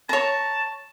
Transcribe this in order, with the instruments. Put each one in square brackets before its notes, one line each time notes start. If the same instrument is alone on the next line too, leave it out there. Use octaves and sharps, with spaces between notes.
[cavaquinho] C#5 A#5 [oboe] A5